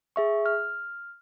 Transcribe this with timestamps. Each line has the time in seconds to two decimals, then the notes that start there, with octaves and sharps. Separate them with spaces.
0.16 G#4 E5 C#6
0.46 F6